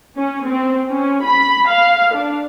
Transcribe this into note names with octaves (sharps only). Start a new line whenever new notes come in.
C#4
C4
C#4
B5
F5
D4